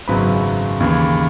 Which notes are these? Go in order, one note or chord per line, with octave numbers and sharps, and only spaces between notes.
G#1 F#2 C#3 F#3 B3 B4
D#2 C#3 E3